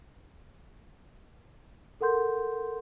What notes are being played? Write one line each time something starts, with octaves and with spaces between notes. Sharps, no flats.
A4 A#4 F#5 C6 G6